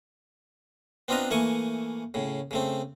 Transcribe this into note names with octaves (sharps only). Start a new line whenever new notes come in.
B3 C4 D4 F4 D#5 A#5
E3 A3 A#3 G#5 C#6
A2 C#3
C#3 A3 C4